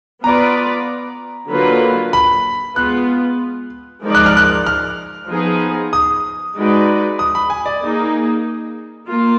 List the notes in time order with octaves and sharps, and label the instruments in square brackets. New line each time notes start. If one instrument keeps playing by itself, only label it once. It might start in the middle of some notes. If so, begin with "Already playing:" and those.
[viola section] B3 F4 B4 D5 [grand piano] A#5
[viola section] D3 F#3 A#3 F4 B4
[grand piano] B5
[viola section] G#3 B3 F4 [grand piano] F#6
[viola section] F3 G#3 D#4 A#4 D5
[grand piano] F#6
F6
F#6
F6
[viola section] F3 B3 D#4 G#4
[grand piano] D#6
[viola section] G#3 D#4 F#4 B4 D5
[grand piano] D#6
B5
G#5
D5
[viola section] A#3 D#4 G#4
A#3 F4